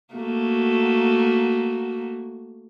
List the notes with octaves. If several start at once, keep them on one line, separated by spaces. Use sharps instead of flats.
A3 A#3 F#4